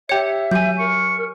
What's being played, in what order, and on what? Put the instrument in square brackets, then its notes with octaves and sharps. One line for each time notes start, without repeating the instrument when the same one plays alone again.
[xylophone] G4 C#5 [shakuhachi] E5 [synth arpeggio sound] G5 C#7
[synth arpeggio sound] F#3 [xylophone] G#5 G6
[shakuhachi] A#4 [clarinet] C#6